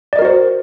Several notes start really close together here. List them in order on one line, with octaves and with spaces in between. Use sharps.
D5 D#5 A#4 F#4 C5